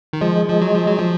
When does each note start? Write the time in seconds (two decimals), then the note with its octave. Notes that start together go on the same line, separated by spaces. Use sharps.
0.13 D#3
0.21 F3 G#3
0.49 F3
0.61 F#3
0.74 F3
0.86 F#3
0.99 F3